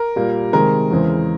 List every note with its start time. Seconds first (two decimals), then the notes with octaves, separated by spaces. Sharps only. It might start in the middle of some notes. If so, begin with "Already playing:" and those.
Already playing: A#4
0.16 A#2 G3 A#3
0.53 C3 D#3 G#3 A#4
0.91 E2 C#3 E3 G#3 C4